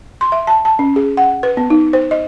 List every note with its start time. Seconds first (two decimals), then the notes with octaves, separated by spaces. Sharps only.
0.21 C6
0.32 E5
0.47 A5
0.65 A5
0.79 C#4
0.96 G#4
1.17 F#5
1.43 B4
1.57 B3
1.70 D#4
1.93 C5
2.11 D#5